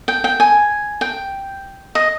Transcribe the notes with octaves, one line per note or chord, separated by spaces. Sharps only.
G5
G5
G#5
G5
D#5